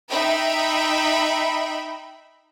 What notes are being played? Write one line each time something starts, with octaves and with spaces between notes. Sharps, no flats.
D#4 E5 G5 B5